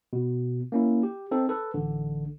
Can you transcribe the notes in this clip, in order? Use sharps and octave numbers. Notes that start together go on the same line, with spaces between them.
B2
A#3 C#4 E4
G4
C4 D#4 A4
A4 B4
A1 D3